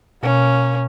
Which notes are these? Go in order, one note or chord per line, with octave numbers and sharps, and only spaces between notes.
B2 A#3 C#4